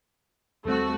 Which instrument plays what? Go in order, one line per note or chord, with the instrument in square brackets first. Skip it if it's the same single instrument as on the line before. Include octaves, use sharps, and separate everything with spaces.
[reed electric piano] D#2 G3 C4 [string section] A3 F#4